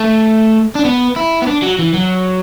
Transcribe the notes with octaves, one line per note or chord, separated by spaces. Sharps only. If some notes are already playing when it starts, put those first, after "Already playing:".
Already playing: A3
D4
B3
E4
B3
D4
F#3
E3
F#3